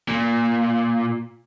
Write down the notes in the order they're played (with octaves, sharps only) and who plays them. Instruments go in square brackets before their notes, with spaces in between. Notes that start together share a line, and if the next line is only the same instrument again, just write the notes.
[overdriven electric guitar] A#2